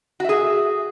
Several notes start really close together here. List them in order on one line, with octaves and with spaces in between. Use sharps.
F#4 E5 G#4